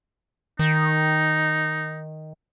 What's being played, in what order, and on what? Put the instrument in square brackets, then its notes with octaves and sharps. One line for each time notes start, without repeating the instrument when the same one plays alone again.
[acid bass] D#3 [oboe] D#4